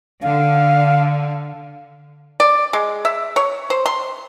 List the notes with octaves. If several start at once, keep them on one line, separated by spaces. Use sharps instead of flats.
D3 F5
D5
G#3
E5
C#5
C5
C6